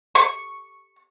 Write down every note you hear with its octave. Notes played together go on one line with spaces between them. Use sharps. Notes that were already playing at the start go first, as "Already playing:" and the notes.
C#6